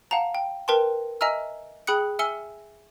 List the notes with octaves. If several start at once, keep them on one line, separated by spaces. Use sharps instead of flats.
F5 F#5 A5 A#5
G5
A#4 B4 G5 A5 C6
D#5 E5 G#5 A#5 E6 F6
G#4 G5 B5 D#6 F#6 C#7
E5 G#5 E6 F6 C#7 G7